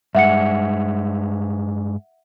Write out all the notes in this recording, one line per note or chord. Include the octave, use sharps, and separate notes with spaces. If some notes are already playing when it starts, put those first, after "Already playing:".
G2 G#3 E5 F#5 C#7